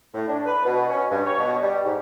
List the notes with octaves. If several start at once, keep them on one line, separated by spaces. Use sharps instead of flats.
A2
D4
B4
B2
C#4
G2
C#5
B2
G3
G#2